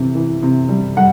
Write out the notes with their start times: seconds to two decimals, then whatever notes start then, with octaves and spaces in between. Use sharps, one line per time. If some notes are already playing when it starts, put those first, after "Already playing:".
Already playing: C3 E3
0.15 E3
0.42 C3
0.69 G3
0.97 G3 F#5